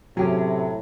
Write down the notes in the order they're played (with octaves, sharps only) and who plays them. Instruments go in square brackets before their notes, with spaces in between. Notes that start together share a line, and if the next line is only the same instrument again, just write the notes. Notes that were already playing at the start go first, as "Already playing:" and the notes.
[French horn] A2 [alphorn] C3 [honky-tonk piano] F#3 [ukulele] C#4 G4 G#4